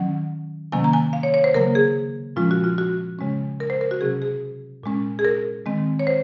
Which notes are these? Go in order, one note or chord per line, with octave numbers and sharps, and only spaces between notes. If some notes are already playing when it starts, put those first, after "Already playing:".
Already playing: D#3 F#3 C#4 F#5
C3 D#3 F#3 A#3 C#4 G#5
A#5
G#5
F5
C#5
C#5
C5
C#3 F#3 A#3 A#4
G#4
A#2 F3 G#3 C#4 F4
F#4
F4
F#4
C#3 G#3 C#4
A#4
C5
A#4
F#4
C3 F#3 C#4 G#4
G#4
A#2 G#3 C#4
G#4
A#4
D#3 G#3 C4
C#5
C5